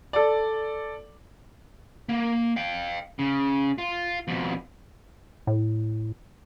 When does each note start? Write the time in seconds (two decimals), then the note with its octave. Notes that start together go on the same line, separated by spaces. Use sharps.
0.13 A4 D5
2.09 A#3
2.56 F5 G5
3.19 C#3
3.78 F4
4.28 F2 B2
5.47 A2